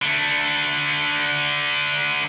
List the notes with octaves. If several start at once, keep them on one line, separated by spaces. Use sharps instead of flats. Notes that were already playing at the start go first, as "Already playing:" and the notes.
D3 A3